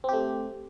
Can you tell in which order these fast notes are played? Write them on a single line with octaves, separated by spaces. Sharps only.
C4 G4 A3